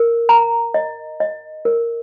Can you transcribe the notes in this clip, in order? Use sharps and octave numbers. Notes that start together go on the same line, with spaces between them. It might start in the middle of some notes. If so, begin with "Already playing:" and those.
Already playing: A#4
A#5
D#5
D#5
A#4